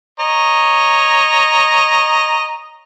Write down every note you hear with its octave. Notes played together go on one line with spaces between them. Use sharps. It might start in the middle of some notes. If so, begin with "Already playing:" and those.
C#5 D#5 A#5